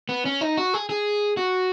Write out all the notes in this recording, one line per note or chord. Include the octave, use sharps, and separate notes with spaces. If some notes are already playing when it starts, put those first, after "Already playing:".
B3
C#4
D#4
F#4
G#4
G#4
F#4